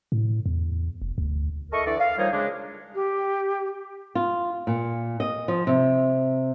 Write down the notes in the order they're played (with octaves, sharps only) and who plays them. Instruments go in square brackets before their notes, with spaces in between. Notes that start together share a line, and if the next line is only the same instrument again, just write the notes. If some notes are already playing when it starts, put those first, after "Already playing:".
[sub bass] A2
E2
F1
D2
[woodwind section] E4 A4 A#4 D#5 C#6
D3 E3 A4 D5
F5
D#3 F3 G3 A#3 D#4 C#5
C#3 G#3 D4
[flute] G4
[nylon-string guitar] F4
A#2
D#5
F3
C3